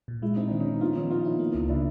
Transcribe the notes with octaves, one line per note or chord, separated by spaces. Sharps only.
A#2
G#3 E4
C4 D#4
D#3 D4
C#4 D#4
D#3
B3 D#4 F4
F3 C#4 D#4
B3 D#4 F4
E4
A#3
C#2
C#3 D4 E4